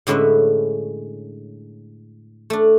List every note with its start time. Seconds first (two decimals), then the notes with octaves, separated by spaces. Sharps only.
0.07 A2 D3 G#3 C#4 B4 E5
2.50 A3 D4